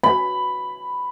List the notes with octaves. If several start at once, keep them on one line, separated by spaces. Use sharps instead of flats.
B5